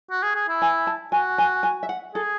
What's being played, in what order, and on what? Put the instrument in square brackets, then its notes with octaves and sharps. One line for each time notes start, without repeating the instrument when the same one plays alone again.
[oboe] F#4
G#4
G#4
E4
[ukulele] G#5
A5
[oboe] F#4 [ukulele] G#5
[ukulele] G#5
G#5
E5
F#5
[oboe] G#4 [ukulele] A4